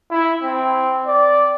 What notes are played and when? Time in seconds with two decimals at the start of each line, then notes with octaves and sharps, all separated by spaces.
0.11 E4
0.43 C4
1.06 D5